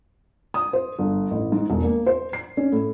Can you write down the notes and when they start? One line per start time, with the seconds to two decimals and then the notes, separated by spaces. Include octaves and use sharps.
0.54 D#6
0.73 C5
0.99 G1
1.31 A1
1.52 G#2
1.70 E1
1.83 A#3
2.06 C5
2.33 C7
2.57 C#4
2.72 A2